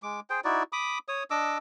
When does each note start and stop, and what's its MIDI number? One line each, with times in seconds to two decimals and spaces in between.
0.03 0.20 56
0.03 0.20 86
0.30 0.40 68
0.30 0.40 72
0.30 0.40 79
0.44 0.63 63
0.44 0.63 64
0.44 0.63 66
0.44 0.63 74
0.72 0.99 83
0.72 0.99 86
0.72 0.99 87
1.08 1.23 73
1.08 1.23 87
1.31 1.58 62
1.31 1.58 75
1.31 1.58 86
1.31 1.58 88